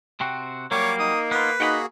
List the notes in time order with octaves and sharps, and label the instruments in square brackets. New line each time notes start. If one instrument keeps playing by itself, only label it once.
[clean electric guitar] C3 C4 F#4
[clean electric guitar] F#3 G3 [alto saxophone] A#3 [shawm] C#5 [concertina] D6
[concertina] D#4 [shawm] D#6
[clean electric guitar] B3 F4 [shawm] B4
[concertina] A#3 F#4 G#4 [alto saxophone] D#4 [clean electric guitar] F#5 G5 B5